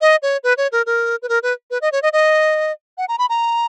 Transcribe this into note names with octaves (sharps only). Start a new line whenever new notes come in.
D#5
C#5
B4
C#5
A#4
A#4
B4
A#4
B4
B4
D#5
C#5
D#5
D#5
F#5
A#5
B5
A#5